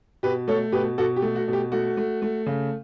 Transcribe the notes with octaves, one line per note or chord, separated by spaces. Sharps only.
B2 G4 B4
A3 A4 C#5
B2 G4 B4
B2 F#4 A4
G4
A3
F#4
B2
G4
A3 F#4
A3
A3
C#3